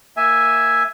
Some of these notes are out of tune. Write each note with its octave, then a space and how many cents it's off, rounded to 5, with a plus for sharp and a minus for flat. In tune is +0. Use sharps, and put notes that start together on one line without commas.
A#3 +0 E5 +0 G#5 +0